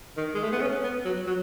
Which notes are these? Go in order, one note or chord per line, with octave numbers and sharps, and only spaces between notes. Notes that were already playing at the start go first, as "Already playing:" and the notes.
D#3
G#3
A3
B3
C#4
B3
F#3
F#3